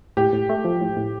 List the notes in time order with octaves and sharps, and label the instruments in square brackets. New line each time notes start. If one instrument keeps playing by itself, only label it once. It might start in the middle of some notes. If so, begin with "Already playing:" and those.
[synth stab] A2 [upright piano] G4
[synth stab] A2
A3
F3
A2
A2